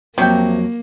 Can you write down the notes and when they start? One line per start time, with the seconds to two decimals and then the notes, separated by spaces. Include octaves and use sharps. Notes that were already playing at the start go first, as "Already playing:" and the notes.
0.18 F2 C3 F#3 A#3 G5